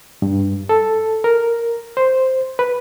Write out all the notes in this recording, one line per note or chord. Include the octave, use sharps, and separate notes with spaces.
G2
A4
A#4
C5
B4